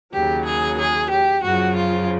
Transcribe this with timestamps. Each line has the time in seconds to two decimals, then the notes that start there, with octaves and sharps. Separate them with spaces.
0.13 D#2 C#3 F#3 G4
0.46 G#4
0.79 G#4
1.11 G4
1.44 F#2 C#3 F3 F#4
1.77 F4